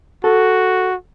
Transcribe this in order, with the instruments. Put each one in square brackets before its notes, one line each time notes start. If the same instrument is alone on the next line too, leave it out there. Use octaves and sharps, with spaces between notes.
[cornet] F#4 [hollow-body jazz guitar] A4